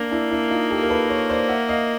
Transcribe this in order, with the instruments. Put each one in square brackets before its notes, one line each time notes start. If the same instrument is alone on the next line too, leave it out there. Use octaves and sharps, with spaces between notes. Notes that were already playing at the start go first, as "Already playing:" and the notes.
Already playing: [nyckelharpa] A#3 [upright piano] D4
[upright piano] D4 E4
D4 E4
D#4 F4
G4 A4
A#4
A4 B4
B4 C#5
C5 D5
E5 F#5
D#5 F5